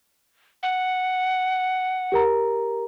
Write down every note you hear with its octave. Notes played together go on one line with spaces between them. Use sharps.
F#5
G4 A#4 A#5